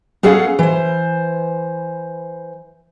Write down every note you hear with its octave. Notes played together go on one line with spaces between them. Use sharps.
B3 C#4 G#4 A4 F5 F#5
E3 C5